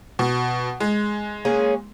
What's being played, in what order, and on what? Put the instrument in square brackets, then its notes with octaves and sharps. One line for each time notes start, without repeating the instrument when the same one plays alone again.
[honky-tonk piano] B2
G#3
[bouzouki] A#3 C#4 G#4